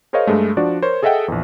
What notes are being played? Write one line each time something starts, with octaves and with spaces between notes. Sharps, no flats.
G#4 A#4 C5 C#5 D#5 F5
G2 G#3 A3
F3 D4 F#4 D5
A#4 C5 C#5
G#4 A4 D#5 E5 F#5 G5
A#1 E2